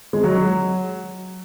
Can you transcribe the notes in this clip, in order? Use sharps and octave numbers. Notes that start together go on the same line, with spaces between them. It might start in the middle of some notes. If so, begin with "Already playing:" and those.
G#3
F#3